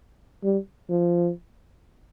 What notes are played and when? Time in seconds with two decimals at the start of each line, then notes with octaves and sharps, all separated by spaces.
0.44 G3
0.90 F3